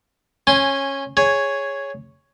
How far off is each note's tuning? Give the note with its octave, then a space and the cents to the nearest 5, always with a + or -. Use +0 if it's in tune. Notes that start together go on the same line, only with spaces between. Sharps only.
C#4 -15 G#5 +0 C6 +0
G#4 -5 C#5 +0